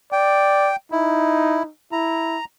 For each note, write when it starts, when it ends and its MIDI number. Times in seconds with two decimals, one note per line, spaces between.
0.12 0.71 74
0.12 0.76 79
0.92 1.70 63
0.92 1.63 64
1.92 2.38 64
1.92 2.45 82